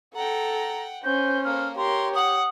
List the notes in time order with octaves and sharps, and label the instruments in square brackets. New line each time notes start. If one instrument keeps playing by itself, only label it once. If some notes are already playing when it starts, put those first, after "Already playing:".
[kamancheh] A4 [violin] F#5 G5 [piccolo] A#5
[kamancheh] C#4 C5 [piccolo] G6
[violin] A#3 A4 [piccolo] F6
[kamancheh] G4 C#5 [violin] A#4 [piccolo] C6
[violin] F#5 [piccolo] D#6